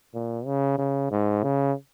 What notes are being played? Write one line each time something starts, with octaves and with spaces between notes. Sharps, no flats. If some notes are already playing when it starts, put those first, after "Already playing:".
A#2
C#3
C#3
G#2
C#3